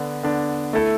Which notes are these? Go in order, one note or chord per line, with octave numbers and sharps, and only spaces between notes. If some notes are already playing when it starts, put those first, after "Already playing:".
Already playing: D3 B3 D4
D3 B3 D4
A3 E4 A4